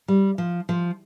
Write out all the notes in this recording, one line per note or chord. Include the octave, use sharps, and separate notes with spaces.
G3
F3
F3